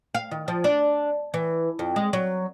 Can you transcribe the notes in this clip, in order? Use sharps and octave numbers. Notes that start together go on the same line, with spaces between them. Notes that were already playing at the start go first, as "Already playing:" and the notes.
F5
D#3
F3
D4
E3
F2
G#3
F#3